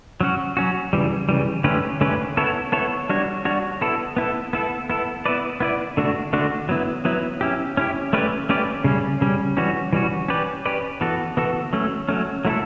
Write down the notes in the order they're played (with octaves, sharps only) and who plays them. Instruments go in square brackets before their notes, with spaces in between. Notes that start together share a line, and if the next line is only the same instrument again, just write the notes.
[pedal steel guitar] F#3 C#4 F#4
F#3 C#4 F#4
C#3 E3 G3
C#3 E3 G3
D3 A3 C#4 G4 B4
D3 A3 C#4 G4 B4
B3 E4 A4 C#5
B3 E4 A4 C#5
G3 D4 F#4 C#5
G3 D4 F#4 C#5
B3 E4 A4
B3 E4 A4
B3 E4 A4
B3 E4 A4
B3 E4 B4 D5
B3 E4 B4 D5
D3 A3 D4 F#4
D3 A3 D4 F#4
F#3 B3 E4
F#3 B3 E4
C#4 E4 G4
C#4 E4 G4
A3 C#4 G4 B4 D5
A3 C#4 G4 B4 D5
C#3 G3 C#4
C#3 G3 C#4
E3 G3 C#4 F#4
E3 G3 C#4 F#4
C#4 G4 B4 D5
C#4 G4 B4 D5
E3 B3 F#4 A4
E3 B3 F#4 A4
F#3 A3 C#4
F#3 A3 C#4
F#3 A3 E4 A4